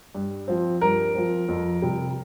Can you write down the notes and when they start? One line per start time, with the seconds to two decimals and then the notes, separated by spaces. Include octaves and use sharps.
0.15 G2
0.48 F3 C4
0.81 G2 A#4
1.15 F3 C4
1.48 F2
1.82 C3 G3